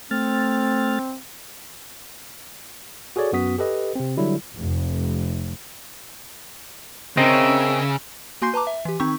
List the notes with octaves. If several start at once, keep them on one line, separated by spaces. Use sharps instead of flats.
A3 C4 F6 A6
F#4 G#4 A4 C#5 D5
F#2 B3 F#4 D#6 B6
G4 A4 B4 D#5
C3 C4
D3 F#3 G3 E4
F1
C#3 C4 C#4 A#4 D#5 E5
A#3 F#4 G#5 C6 G6 C7
B4 A5 A#5 D6
E5
E3 G4
D#3 C4 D#4 C#6